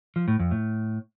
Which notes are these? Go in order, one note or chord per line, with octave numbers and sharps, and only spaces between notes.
F3
A2
F2
A2